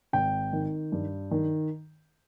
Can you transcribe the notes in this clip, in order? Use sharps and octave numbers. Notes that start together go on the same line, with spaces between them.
G#1 G5
D#3
G2
D#3